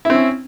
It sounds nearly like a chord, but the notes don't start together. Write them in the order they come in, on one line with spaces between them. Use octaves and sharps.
E4 C4 C#4